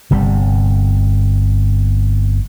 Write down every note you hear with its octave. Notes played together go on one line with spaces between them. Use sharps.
G1 C3 G3